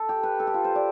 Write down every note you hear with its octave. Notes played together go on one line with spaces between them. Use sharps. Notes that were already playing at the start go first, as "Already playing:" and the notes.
Already playing: A4
G4
B4
A4
G4
F4
C5
D5